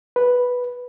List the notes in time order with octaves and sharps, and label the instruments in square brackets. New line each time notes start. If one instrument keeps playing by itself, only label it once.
[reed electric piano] B4